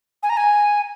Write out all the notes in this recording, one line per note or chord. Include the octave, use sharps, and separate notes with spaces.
G#5
A#5
G#5